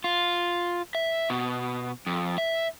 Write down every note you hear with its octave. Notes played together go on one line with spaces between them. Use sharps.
F4
E5
B2
F2
E5